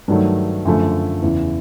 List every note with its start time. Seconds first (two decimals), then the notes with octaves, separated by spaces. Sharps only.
0.08 G2 D#3 F#3 A3
0.65 F#2 D3 F3 A3
1.23 E2 C#3 E3